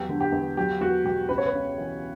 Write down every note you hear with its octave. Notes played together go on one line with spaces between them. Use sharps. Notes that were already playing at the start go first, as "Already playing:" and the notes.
Already playing: E2 F#3 G4
D3
G4
E2
F#3 G4
E2 F#4
B2 G4
C#2 B4
C#5
B4
C#3
E3